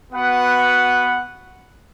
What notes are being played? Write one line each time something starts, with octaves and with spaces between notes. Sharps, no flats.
B3 F#4 B4 F#5